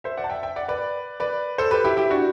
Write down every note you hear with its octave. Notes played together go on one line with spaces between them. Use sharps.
C5 E5
D5 F#5
A5
E5 G5
E5 G5
D5 F#5
B4 D5
B4 D5
A4 C5
G4 B4
E4 G4
E4 G4
D4 F#4